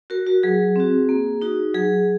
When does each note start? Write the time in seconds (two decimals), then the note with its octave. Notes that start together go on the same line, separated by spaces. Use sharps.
0.10 F#4 A#4
0.26 F#4
0.43 F#3 G#4
0.76 C4 F#4
1.09 A#3
1.42 D#4 F#4
1.74 F#3 G#4